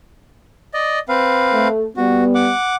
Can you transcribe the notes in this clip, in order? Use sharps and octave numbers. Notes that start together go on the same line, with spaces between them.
D5 D#5
C4 B4 F5
A3
G3 B3 F#4
F#5 D6